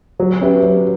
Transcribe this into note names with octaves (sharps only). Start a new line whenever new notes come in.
F#3
C#4 G4 B4 E5
F#3